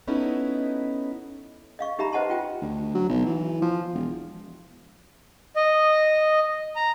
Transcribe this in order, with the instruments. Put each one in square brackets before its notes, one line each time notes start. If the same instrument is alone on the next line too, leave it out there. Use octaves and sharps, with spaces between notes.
[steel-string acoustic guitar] B3 C#4 D#4 E4 A4 B4
[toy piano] D#5 F5 C#6
D#4 G4 E5 A#5 B5
B4 C5 D#5 F#5 A5 C6
F4 G5
[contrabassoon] D2
F#3
B1
E3
F3
E1
[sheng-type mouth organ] D#5
A#5